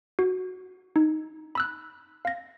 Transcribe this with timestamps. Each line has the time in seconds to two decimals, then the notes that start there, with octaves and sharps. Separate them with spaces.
0.19 F#4
0.96 D#4
1.55 B5 E6 F#6
2.25 F5 A#6